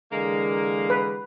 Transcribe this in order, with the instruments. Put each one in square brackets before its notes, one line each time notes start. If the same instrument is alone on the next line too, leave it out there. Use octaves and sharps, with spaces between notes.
[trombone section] D3 E3 G#3 [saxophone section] A#3
[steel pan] B4